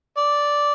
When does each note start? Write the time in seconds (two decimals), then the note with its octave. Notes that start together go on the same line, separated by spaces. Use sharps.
0.18 D5